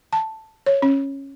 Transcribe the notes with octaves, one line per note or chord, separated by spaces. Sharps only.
A5
C#5
C#4